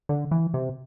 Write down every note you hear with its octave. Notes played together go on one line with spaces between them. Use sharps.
D3
E3
C3